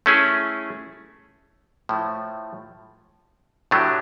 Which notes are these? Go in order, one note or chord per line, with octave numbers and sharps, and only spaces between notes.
A3 C#4 E4 G#4
A2 F3 A3
A2 F#3 A3 D4 G4